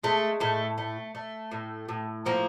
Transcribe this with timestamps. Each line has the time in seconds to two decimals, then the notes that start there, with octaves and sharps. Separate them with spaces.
0.04 G#3 A3
0.40 A2 A3
0.78 A3
1.15 A3
1.52 A2
1.89 A2
2.26 F3 A#3